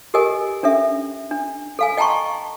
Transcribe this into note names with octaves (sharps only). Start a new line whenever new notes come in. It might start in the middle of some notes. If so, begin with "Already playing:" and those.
G4 A4 A#4 D#5 G#5
C#4 D4 A4 E5
D4
A4 F5 G#5
D#5 G5 A5 A#5 C6 C#6